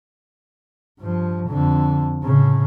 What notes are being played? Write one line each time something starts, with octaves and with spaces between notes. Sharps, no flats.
G2 F3
F2 D3
A2 C#3